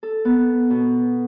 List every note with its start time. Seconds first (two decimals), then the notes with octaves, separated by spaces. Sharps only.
0.03 A4
0.25 B3
0.70 B2